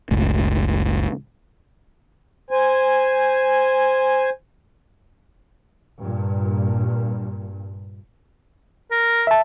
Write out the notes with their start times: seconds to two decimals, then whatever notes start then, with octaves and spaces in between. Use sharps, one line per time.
0.11 F#1 C#2 A2
2.51 C5 G#5
6.01 G2 A#2
8.91 A#4
9.27 E5 A5